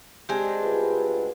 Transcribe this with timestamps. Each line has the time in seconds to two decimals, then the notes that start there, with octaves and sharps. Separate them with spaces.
0.29 G#3 C4 D4 G4
0.63 D2 F4 B4